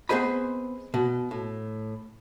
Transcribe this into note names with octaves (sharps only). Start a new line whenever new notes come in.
B3 C4 G#4 C5 D#5 B5
B2
A2